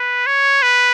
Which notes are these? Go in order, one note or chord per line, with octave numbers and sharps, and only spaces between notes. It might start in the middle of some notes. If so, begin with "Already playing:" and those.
Already playing: B4
C#5
B4